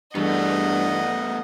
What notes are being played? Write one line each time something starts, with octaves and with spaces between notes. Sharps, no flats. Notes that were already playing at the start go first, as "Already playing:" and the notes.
E2 G2 A3 B3 D#5 F#5